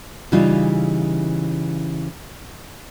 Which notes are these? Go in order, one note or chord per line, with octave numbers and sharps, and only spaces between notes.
C#3 E3 G3 D#4 F4